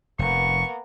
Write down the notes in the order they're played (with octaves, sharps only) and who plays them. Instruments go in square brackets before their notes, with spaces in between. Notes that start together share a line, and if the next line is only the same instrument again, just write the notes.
[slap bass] F1 [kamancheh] A#3 B3 [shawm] C#6